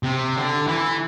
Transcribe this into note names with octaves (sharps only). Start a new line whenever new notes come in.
C3
D3
E3